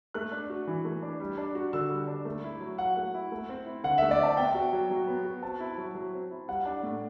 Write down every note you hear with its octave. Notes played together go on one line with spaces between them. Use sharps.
A3 F#6
D4
F#4
E3
A3
D4
G3
D4
F#4
D3 E6
G3
D4
A3
E4
F#3
F#3 F#5
A3
E4
A3
C4
E4
D3 F#5
E5
A3
D5
C4 A5
B3 G5
F#4
F#3
F#3
B3
F#4
C4 A5
E4
F#3
F#3
C4
E4
G3 F#5
D4
A2